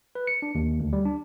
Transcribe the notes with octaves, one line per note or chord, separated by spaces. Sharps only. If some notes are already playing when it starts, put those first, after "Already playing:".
B4
C#7
D4
D#2
D2
G3
D4